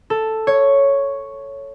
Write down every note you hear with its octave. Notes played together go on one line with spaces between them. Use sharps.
A4
C#5